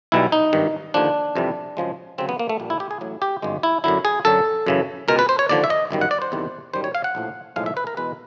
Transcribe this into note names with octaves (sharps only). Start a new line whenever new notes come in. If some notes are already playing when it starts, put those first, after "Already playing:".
B1 B2 G3 E4
D#4
G#1 G2 D#3
D#2 D3 F3 D4
F2 C3 E3 G3
F#2 C#3 F3 G#3
D2 C#3 F#3 C4
B3
A#3
A3
A#1 A#2 G3
E4
G4
G#4
A1 A2 F#3
G4
G1 F#2 D#3 G#3
E4
F#2 D3 F#3 E4
G#4
F#2 D3 F#3 A4
F#2 C#3 E3
C#2 B2 G#3 A#4
B4
C5
C#5
D#2 D3 F3 D5
E5
D#5
G1 F#2 D#3 G3
F#5
D5
C5
E2 C3 D#3 G3
F#2 D#3 G3 C5
C#5
F5
F#5
A#1 A2 F3
B1 A2 F3 G#3 F5
E5
B4
A#4
E2 B2 G#3 B4